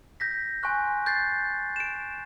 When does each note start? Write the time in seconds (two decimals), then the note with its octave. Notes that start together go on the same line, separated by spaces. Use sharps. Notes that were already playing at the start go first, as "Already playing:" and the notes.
0.20 G6 A#6 B6
0.63 G#5 C6 C#6 F#6
1.06 G6 A6 C7
1.76 D7 E7